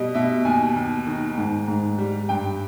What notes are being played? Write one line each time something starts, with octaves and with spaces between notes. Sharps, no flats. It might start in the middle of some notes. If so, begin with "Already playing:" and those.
Already playing: B2 G3 D#5
B2 E5
D#2 G#5
D#2
D#3
G#2
G#2
G3
G2 G5